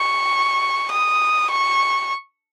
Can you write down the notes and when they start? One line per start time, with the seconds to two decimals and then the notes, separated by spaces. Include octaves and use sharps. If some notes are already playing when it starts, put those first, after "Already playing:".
Already playing: C#6
0.92 D#6
1.51 C#6